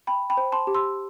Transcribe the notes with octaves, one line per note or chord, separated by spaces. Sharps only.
G5 B5
G5 B5
C5
A5 C6
G4
C6 E6